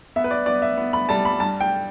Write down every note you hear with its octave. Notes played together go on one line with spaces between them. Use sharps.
B3 E5
B4
D5
B3 D5
E5
B3
B5
G3 A5
B5
G2 A5
G5